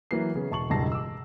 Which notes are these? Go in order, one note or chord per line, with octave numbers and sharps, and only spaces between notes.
E3 F#3 A#3 B4 C7
C#3 B3
E1 A5 C#6 F#7
E1 C#2 G2 A5 A#6 C7
D6 E6